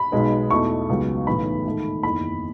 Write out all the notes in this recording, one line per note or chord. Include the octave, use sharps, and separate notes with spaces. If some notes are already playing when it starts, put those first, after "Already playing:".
Already playing: B5
B1 B2 G#3 B3 D#4
E2 B2 A3 D#4 C#6
C#2 C#3 F#3 B3 D#4
B1 A2 E3 B3 D#4 B5
G#2 D#3 A3 D#4
F#1 E2 D#3 B5